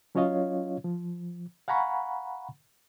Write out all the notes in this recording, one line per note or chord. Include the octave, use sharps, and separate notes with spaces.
F#3 C#4 F4 C#5 D#5 F5
F3
F5 F#5 G#5 A#5 B5 C#6